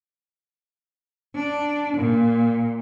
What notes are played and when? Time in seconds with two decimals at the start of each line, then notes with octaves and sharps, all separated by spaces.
1.35 D4
1.96 A#2